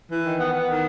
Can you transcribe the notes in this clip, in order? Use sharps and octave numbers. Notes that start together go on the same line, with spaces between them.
E3
D#3
B3
B3
D#3